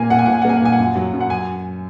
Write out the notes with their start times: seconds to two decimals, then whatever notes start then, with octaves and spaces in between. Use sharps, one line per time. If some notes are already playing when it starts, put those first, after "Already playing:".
Already playing: A#2 A#3 G#5
0.10 A#2 F#5
0.19 G#5
0.26 A#2 F#5
0.33 G#5
0.42 F#5
0.45 A#3 G#5
0.57 F#5
0.62 A#2 G#5
0.73 F#5
0.79 F#2
0.96 F#3
1.13 F#2
1.20 F#5
1.30 G#5